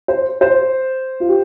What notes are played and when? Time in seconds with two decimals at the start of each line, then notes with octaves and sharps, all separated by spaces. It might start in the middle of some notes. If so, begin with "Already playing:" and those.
0.08 C5
0.41 C5
1.20 F4
1.29 G4